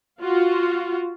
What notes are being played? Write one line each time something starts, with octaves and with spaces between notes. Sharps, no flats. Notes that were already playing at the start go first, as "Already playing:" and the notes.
F4 F#4